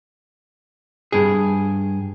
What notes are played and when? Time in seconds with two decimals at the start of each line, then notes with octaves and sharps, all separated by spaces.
1.12 G2 G#4